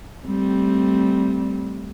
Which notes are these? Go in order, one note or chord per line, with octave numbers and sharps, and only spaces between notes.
G3 A3 C4